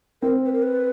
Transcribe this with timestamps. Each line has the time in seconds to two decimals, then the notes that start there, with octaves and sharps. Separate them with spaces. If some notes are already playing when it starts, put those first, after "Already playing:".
0.22 C4 A#4
0.45 B4
0.53 A#4
0.62 B4